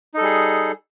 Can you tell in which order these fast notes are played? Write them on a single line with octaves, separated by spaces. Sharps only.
D#4 A4 G3 G#4